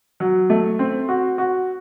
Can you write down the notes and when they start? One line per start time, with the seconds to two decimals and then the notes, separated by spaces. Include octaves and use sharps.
0.20 F#3
0.50 A3
0.79 C4
1.09 F#4
1.38 F#4